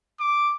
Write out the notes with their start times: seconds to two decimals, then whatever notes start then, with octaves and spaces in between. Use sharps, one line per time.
0.20 D6